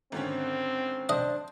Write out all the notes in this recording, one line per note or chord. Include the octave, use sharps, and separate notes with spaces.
G#1 D3 C4 C#4
D4 C5 D#5